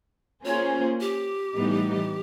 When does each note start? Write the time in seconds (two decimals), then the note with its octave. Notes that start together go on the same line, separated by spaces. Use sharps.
0.45 A#3 C#4 F4 G#4 C5 C#5
1.01 G4
1.55 A2 E3 G3 B3 D#4